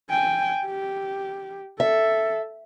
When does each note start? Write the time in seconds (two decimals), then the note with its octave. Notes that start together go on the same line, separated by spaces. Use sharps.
0.11 G5 G#5
0.66 G4
1.80 A4 E5